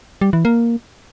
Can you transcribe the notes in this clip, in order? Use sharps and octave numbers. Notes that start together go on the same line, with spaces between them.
G3
E3
A#3